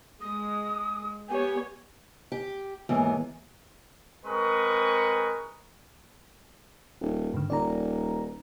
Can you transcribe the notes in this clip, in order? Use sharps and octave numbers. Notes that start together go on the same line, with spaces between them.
G#3 D#6
B3 G4 C#5 G#5
G4
D#2 G#2 E3 B3
G#3 C4 A#4 B4 C#6 D#6
D#1
G#2 D3
D#1 D5 A#5